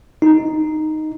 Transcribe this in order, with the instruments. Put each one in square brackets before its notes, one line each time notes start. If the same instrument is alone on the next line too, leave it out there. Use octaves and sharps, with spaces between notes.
[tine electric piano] D#4